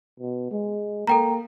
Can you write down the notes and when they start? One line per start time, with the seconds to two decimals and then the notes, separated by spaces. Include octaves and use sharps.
0.20 B2
0.51 G#3
1.07 A#3 A4 G5 A#5